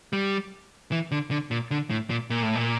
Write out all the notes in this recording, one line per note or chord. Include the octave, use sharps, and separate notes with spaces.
G3
E3
D3
D3
A#2
D3
A2
A#2
A#2
A2
A#2